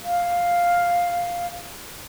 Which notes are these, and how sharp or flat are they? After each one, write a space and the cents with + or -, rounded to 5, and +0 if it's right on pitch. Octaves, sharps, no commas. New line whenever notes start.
F5 +5